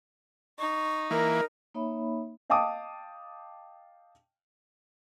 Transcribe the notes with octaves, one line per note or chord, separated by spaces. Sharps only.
D#4 C#6
E3 A#3 A#4
A#3 D#4 C#5 E5 B5
D#5 F5 G5 A5 D6 D#6